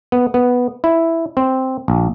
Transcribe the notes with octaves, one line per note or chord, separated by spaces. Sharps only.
B3
B3
E4
C4
A#1